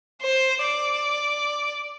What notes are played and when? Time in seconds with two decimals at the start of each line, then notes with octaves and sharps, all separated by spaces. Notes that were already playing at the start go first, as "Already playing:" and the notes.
0.22 C5
0.62 D5